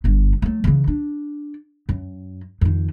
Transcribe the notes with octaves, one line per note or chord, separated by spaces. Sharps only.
G1 G2
F#3 A3
C#3 E3
D4
F#2
F2 D#3